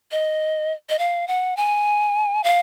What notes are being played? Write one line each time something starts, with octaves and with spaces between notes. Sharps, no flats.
D#5
D#5
F5
F#5
G#5
F5